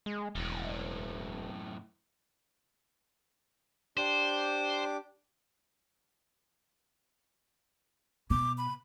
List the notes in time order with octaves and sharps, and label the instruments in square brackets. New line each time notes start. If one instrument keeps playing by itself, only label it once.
[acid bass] G#3
[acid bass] E1 [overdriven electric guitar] F#2 A2
[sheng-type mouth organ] D4 G4 D6 [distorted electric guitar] C5
[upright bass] B2 [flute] D6
[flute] B5